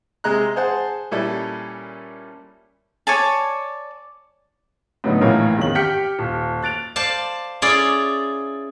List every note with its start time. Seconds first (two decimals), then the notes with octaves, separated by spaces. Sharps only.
0.24 C3 G#3 G#4 A#5 F#6
0.56 G#4 C5 F#5 A5
1.11 A#2 G3 C#4 E4 A4
3.07 C#5 D5 G#5 A5
5.04 A2 D3 F#3 B3 C#4 D#4
5.21 A#1 A2 E3 A#4 C#5 F5
5.57 G#1 E2 D#3 C#4 F#7
5.75 G4 G5 F6 G6 B6 C#7
6.19 D#1
6.62 F#6 A6 D7 F7
6.96 C5 D5 F5 A5
7.62 C#4 E4 F4 G#4 D5